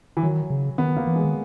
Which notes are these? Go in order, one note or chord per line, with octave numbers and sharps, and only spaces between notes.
E3
D#3 F#3
C#3
D#3 B3
A#3
E3
G#3
D#3